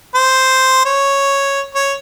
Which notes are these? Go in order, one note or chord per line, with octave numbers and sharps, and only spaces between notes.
C5
C#5
C#5